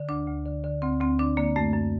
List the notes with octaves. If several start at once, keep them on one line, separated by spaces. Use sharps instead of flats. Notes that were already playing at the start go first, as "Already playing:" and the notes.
Already playing: D3
D2 D4
D2
D3
D3
D2 C4
D2 C4
D3 D4
D3 A#3
F#2 A3
F#2